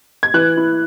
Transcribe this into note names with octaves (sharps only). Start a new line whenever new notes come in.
G#6
E3 F#6
E4